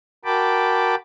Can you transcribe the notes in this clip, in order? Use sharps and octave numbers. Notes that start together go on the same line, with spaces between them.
F#4 A#4 G5 A5 B5 D6